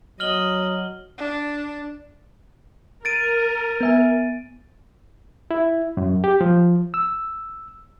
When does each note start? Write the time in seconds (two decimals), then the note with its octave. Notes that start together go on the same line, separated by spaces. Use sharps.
0.20 F#3 D#5 F6 F#7 G7
1.18 D4
3.05 A#4 A6 D7 D#7
3.81 B3 E5 G#5
5.51 E4
5.97 F#2
6.24 G4
6.41 F3
6.94 E6